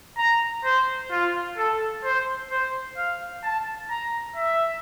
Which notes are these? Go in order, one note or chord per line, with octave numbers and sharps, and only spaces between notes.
A#5
C5
F4
A4
C5
C5
F5
A5
A#5
E5